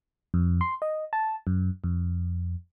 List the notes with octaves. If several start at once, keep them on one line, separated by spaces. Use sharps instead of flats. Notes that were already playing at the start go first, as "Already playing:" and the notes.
F2
C6
D#5
A5
F#2
F2